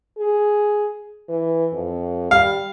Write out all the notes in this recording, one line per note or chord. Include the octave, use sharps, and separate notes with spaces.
G#4
E3
F2
G3 F5